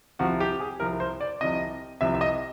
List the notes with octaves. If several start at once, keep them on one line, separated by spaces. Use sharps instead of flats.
C2 C3 F3 F#4
G4
G#4
C2 C3 F3 A#4
C5
D5
C2 C3 F3 D#5
C2 C3 F3 E5
E5
D#5